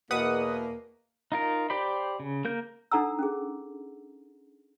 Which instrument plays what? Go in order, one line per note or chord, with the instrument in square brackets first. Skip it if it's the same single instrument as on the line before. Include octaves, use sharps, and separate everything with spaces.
[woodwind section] E2 B2 [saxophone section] A#3 [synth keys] B4 F#5 D#6
[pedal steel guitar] D#4 F4 A#4
G4 C5 D5 B5
C#3
A#3 A#4 G6
[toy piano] D4 D#4 A4 F#5 A#5 E6
C#4 G#4